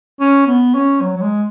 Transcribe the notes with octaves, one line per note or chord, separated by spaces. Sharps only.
C#4
B3
C#4
F#3
F#3
G#3